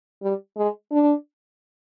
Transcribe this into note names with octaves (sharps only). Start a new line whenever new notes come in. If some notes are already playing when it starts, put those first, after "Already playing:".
G3
G#3
D4